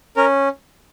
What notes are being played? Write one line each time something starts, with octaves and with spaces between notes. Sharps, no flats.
C#4 A#4